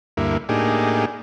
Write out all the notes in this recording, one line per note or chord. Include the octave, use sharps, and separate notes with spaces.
D2 G2 A#3 E4
A2 A#3 D4 D#4 G4 G#4